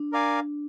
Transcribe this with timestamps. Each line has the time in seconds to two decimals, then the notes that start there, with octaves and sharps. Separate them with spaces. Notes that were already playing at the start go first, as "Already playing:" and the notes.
Already playing: D4
0.12 A#4 D5 F5 G#5